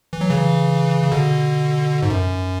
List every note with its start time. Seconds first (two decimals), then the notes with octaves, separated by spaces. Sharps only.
0.13 E3
0.21 F#3
0.30 C#3 E3
1.04 C#3
1.12 B2 D3
2.02 G#2
2.10 F#2